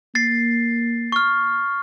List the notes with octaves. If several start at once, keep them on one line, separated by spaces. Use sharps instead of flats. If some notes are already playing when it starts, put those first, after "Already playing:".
A#3 A6 C7
C#6 F6